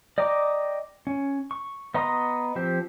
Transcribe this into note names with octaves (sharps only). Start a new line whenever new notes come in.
D5 D#5 G5 A#5 D6
C#4
C#6
B3 D#5 A#5 C6 D#6
F3 C4 G4